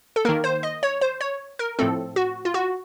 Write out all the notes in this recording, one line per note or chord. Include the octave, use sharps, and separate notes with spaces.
A4
D#3 A#3 A#4
C5
D#5
C#5
C5
C#5
A#4
A2 F3 A3 C4 A4
F#4
F4
F#4